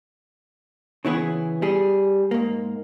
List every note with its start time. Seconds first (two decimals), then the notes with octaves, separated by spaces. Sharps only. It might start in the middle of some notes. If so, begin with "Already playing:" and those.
1.05 C#3 E3 B3 G#4
1.62 G3 G#4
2.31 G#2 A#3